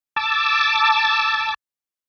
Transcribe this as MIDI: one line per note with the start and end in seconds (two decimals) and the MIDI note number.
0.16 1.54 81
0.16 1.54 86
0.16 1.54 88